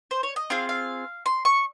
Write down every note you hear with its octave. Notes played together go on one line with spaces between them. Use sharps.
C5
C#5
D#5
C4 F4 G#4 F5
F5
C6
C#6